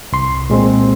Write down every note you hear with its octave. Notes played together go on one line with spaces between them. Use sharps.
C2 C6
A#2 G#3 C4